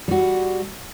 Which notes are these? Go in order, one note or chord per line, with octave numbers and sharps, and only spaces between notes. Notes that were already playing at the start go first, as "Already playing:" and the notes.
G3 F#4